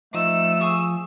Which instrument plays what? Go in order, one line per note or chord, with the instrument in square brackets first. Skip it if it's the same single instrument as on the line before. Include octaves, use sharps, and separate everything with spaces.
[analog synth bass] F3 [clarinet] A3 [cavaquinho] D#4 [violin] E6
[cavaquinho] G#4 C#6 D#6